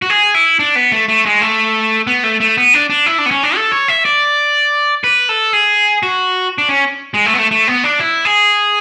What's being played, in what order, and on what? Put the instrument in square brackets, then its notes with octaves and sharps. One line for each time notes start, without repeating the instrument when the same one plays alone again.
[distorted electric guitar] F#4
G#4
E4
D4
B3
A3
A3
G#3
A3
B3
A3
A3
B3
D4
D4
E4
D4
B3
C#4
D4
A4
C#5
E5
D5
B4
A4
G#4
F#4
D4
C#4
G#3
A3
B3
A3
A3
B3
D4
E4
G#4